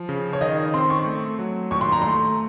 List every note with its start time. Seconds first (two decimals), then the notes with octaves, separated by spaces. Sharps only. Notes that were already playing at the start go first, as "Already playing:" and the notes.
Already playing: F3
0.09 C#3
0.33 C#5
0.41 D#3 D#5
0.74 C4 C6
0.90 C#6
1.06 A3
1.39 F#3
1.71 D#2 C#6
1.81 C6
1.92 A#5
2.02 A3 C6